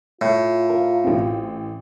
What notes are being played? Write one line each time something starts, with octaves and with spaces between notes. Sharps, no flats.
A2 F4
A#4
A1 C4